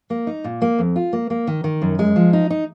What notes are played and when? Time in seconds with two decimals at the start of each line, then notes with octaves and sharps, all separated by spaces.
0.10 A#3
0.27 D#4
0.44 A#2
0.62 A#3
0.79 F2
0.96 F4
1.13 A#3
1.30 A#3
1.47 D#3
1.64 D#3
1.82 F#2
1.99 G#3
2.16 F3
2.33 D#4
2.50 D#4